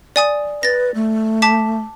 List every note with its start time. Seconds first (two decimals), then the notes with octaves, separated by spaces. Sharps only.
0.16 D5 G#5 D#6
0.63 B4 A6 A#6
0.95 A3
1.42 A5 D6 B6